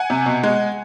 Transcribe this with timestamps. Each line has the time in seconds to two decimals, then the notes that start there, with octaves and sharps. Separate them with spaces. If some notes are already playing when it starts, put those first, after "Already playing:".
Already playing: F#5 G#5
0.10 C3
0.26 B2
0.43 G#3